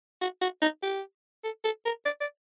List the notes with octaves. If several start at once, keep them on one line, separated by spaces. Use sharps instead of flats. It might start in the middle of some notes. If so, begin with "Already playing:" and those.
F#4
F#4
D#4
G4
A4
A4
A#4
D5
D5